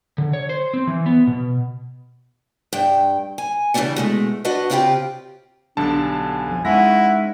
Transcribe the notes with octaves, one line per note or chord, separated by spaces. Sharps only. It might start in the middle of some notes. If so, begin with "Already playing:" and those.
D3
C#5
C5
C4
E3
B3
B2
G2 G5
G#5
C#3 E3 G3 A3 C#4 D4
B2 G#3 A3
D4 F#4 B4 D#5 F#5
C#3 C4 E4 F4 G4 G5
B1 D3 G3 D4 A5
G#5
F2
G#3 C#4 D#4 E4 F#5 A#6